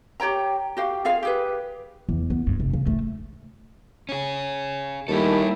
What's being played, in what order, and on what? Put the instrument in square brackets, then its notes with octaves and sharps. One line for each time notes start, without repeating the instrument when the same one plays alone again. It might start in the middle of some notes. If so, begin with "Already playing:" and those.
[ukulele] G4 C#5 G5 A#5
F#4 G4 F5
F4 G#4 F5
G4 G#4 B4
[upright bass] E2
B3
G2
F1
C#3
A3
[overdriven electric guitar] C#4 G#4
[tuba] D#2 [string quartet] G3 A3 E4 [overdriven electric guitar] G4 A4